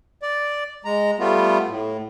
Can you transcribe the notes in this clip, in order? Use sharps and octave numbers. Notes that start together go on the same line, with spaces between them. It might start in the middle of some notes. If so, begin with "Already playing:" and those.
D5
G#3 A#5
G3 A3 B3 F4
A2